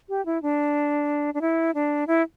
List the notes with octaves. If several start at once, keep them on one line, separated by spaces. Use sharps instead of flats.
G4
E4
D4
D4
E4
D4
E4